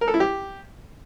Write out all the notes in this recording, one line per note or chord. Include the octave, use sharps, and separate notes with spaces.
A#4
A4
E4
G4